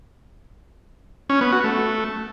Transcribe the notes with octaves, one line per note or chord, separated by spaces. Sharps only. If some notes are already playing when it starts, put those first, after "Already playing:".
C#4
B3
F#4
A3